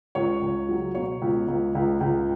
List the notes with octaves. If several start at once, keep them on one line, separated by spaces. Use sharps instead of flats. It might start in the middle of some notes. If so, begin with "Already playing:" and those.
C#2 C#5
C#2
F#3
B2 C#5
C#2
C#2
C#2
C#2